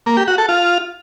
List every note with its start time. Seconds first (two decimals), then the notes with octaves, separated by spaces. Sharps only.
0.06 A#3
0.17 G4
0.28 F#4
0.38 A4
0.49 F4